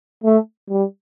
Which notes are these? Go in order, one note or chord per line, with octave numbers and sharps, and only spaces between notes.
A3
G3